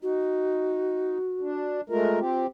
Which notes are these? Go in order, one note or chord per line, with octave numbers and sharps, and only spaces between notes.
D#4 F#4
D4
G#3 A3 F4 A#4
C4 G4